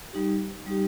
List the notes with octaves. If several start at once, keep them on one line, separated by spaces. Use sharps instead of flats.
G3 D#4 G4
G3 D#4 G4